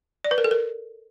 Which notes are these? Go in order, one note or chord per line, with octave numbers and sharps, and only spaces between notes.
D5
B4
A#4
A4
A#4